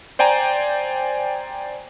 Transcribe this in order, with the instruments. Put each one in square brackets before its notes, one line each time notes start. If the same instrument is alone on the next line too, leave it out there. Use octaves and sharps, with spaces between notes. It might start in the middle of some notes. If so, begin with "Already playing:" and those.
[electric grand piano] C5 D5 G5 G#5 A#5